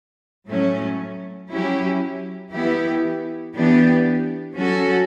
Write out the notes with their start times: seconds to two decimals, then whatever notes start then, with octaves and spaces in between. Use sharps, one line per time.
0.49 A2 F#3 A3 C#4
1.51 F#3 C#4 E4 G4
2.52 E3 B3 E4 G4
3.55 E3 B3 D4 G4
4.56 F#3 C#4 F#4 A4